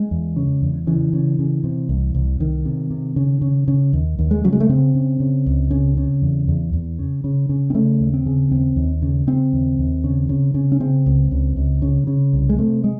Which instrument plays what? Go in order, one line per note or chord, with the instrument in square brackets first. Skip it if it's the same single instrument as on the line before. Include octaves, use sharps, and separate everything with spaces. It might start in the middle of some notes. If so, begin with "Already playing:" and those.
Already playing: [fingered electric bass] G#3
E2
C#3
E2
C#3 E3
C#3
C#3
C3
C2
C2
C2 D#3
C3
C3
C#3
C#3
C#3
D#2
D#2
G#3
C#3 F#3
G#3
A3
C#3 C4
C#3
C#3
C#2
C#3
C#3
E2
E2
E2
C#3
C#3
C#3
C4
C#3 A3
D#2
C4
C#3
D#2 C4
D#2
C#3
C#3 C4
D#2
D#2
C#3
C#3
C#3
C#4
C#3 C4
C#2
C#2
C#2
C#3
C#3
C2
G#3
C3 A3
G#3